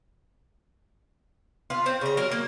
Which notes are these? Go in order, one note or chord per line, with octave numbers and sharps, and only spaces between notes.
F4 B4
C4
C#3 A#5
F#3 A#4
A#3